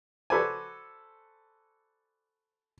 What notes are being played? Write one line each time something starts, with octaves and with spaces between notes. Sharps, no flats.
F#4 A4 B4 C5 D5 G#5